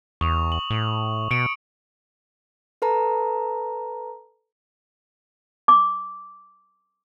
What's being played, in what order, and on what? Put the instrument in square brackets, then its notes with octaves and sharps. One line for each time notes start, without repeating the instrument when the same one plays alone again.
[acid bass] E2 [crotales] C#6 D#6 F7
[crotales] F#7
[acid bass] A2
[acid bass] B2 [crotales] C#7 D7
[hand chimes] A4 B4 A5 A#5
[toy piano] D6